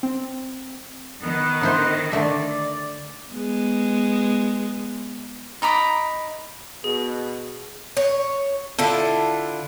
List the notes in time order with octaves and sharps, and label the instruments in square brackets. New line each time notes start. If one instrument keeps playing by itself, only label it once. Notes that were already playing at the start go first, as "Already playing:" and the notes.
[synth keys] C4
[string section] D#3 [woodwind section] B3
[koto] D3 E4 C5
[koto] D3 A3 E5 [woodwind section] D5
[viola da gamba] G#3 B3
[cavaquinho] D#4 A#5 B5 D6
[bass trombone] B2 [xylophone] G#4
[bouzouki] C#5
D3 E4 F4 A4